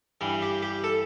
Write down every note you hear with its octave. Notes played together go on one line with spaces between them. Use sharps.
G2 E3 G3
G4
G4
A4